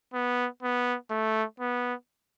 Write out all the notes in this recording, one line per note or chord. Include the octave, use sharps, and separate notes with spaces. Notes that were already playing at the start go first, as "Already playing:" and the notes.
B3
B3
A3
B3